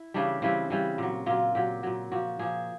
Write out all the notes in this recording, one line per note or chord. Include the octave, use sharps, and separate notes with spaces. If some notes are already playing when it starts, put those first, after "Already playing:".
Already playing: E4
C#3 E3 G3 D4
C#3 E3 G3 C4
C#3 E3 G3
A#2 F#3
A#2 F#3 F4
A#2 F#3 G4
A#2 F#3
A#2 F3 F#4
A#2 F3 G#4